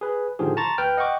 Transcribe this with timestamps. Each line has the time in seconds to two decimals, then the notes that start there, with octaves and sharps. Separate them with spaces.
0.01 G#4 B4
0.39 A2 D3 D#3 F3 G4 G#4
0.57 A5 A#5 C6 C#6 A6
0.78 D2 B4 G5 F6
0.97 D#5 F#5 G5 C#6 D6